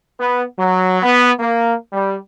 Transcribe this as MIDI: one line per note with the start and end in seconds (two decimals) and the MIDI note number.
0.19 0.43 59
0.59 1.00 54
1.02 1.31 59
1.39 1.75 58
1.93 2.17 55